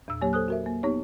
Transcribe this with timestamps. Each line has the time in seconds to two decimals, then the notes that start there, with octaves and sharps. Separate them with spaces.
0.08 E2 A#2 E6
0.21 F#3 A#3 G4 C#5
0.33 A4 C5 D#6 F#6
0.48 F#4 A#4 E5
0.66 A#3
0.83 B3 D#4 G4 C#5